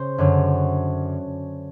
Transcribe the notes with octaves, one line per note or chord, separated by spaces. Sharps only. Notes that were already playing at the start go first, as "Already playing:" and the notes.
Already playing: C#3 C5
F#2 D3 F#3